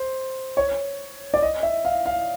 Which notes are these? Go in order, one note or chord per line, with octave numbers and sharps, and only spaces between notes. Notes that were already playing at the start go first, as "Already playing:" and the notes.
Already playing: C5
C#5
D5
D#5
E5
F5
F5